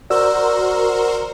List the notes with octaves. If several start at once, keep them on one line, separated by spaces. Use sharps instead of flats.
F#4 A#4 C5 D5 E6